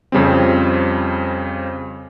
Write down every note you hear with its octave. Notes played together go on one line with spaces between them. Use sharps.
F2 C#3 G3 C4